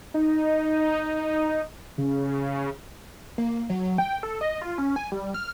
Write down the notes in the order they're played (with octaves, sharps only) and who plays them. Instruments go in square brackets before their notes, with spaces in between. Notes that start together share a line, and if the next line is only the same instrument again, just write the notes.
[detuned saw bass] D#4
C#3
[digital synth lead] A#3
F#3
G5
A4
D#5
F4
C#4
G#5
G3
F6